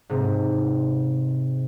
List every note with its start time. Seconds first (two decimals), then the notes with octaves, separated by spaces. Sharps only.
0.09 G#2 C3